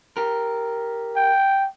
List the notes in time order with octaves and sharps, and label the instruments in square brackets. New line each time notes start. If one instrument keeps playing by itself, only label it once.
[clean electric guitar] G4 A#4
[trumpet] G5